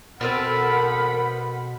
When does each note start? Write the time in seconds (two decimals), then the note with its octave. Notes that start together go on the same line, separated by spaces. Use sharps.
0.21 B2 B3 C4 A4 A#4 F#5 B5